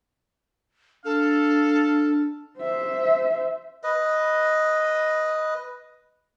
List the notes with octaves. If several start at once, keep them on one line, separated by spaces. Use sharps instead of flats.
D4 A4 F5
C5 E5
B4 D#5